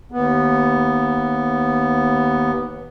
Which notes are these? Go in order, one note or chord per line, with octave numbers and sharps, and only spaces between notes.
D#2 B3